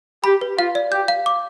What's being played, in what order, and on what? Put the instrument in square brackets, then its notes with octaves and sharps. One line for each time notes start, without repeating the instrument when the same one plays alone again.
[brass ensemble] G4 [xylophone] B5
[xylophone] B4
[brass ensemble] F4 [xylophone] F5
[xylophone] D5
[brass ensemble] G4 [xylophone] G6
[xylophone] F5
D6